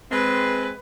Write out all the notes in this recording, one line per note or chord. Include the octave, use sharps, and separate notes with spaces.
G#3 C4 B4